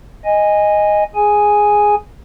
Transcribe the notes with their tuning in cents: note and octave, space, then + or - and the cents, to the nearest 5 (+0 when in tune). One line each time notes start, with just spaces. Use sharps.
D#5 +0 G#5 -10
G#4 +0 G#5 +0